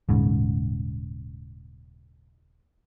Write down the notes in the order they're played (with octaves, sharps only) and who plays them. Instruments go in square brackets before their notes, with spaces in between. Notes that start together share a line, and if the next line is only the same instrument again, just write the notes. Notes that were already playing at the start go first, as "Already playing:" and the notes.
[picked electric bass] D#1 G#2 C#3